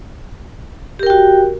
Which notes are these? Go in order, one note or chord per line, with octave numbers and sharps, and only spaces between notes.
F#4 G4 A#4 G5